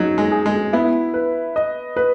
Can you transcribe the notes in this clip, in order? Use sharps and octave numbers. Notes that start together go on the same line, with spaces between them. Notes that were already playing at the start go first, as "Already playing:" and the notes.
Already playing: F#3 D#4
G#3
G#4
G#3
B3 E4
B4
D#5
B4